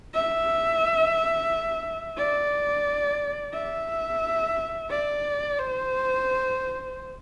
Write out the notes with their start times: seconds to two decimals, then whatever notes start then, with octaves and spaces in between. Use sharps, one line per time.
0.14 E5
2.18 D5
3.54 E5
4.90 D5
5.58 C5